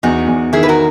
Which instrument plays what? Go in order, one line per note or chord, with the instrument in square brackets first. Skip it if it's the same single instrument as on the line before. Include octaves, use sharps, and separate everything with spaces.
[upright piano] E2 [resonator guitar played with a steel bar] D#4 F#4
[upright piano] E2
[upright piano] D#3 [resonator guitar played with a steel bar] E4 G#4
[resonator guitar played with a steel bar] B4
F#4 A#4